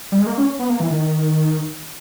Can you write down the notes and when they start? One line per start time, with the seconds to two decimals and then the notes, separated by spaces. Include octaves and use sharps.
0.12 G3
0.19 G#3
0.27 A#3
0.38 C#4
0.59 B3
0.70 A#3
0.80 E3
0.91 D#3